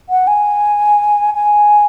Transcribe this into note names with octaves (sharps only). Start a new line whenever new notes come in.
F#5
G#5
G#5